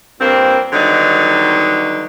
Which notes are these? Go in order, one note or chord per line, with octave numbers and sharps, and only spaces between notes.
G2 A#2 A#3 C4
D3 D#3 F#3 G3 B3 D#4